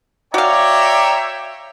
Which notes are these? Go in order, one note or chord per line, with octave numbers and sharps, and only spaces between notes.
F#4 C#5 D5 E5 F5 G5 A#5